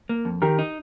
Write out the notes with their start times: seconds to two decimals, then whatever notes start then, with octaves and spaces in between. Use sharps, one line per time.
0.09 A#3
0.25 F2
0.42 D#3 G4 A#4
0.59 D#4